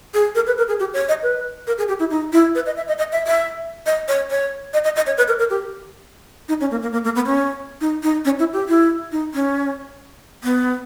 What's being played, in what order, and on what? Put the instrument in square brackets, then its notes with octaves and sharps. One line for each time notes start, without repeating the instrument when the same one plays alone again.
[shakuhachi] G#4
A#4
B4
A#4
G#4
G4
C#5
D#5
B4
A#4
G#4
G4
E4
D#4
E4
B4
D#5
E5
D#5
D#5
E5
E5
D#5
C#5
C#5
D#5
D#5
D#5
C#5
B4
A#4
A#4
G4
D#4
C#4
A#3
A#3
A#3
A#3
B3
C#4
D#4
D#4
C#4
E4
G4
E4
D#4
C#4
B3